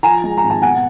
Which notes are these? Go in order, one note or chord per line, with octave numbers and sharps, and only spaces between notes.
F3 G#5 A#5
G#3
A#5
G#1
A5
B2 F#5 G#5